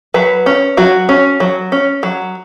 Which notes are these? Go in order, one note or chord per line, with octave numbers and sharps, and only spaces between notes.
F#3 B4
C#4
F#3 F#4
C#4
F#3
C#4
F#3